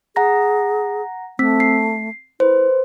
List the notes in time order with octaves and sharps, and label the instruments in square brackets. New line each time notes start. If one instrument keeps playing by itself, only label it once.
[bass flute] G#4 [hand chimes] F#5 A#5 A#6
[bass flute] A3 [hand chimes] C4 E6 B6
[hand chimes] C7
[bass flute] E4 [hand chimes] B4 C5